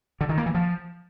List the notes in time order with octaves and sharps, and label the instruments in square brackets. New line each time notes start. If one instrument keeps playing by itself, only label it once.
[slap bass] D3
D#3
A#3
E3
F3